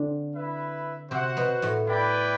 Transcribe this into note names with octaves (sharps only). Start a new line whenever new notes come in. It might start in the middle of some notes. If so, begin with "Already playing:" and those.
Already playing: D3 C4 D4
E4 B4 E5
C3 C4 F#4 C5 F#5
B2 B3
A2 A3
E4 B4 D5 G5